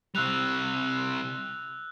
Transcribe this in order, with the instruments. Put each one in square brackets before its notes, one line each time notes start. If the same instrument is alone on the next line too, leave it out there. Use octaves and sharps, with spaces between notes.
[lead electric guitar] C3 G3 [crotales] E6 F#6 F7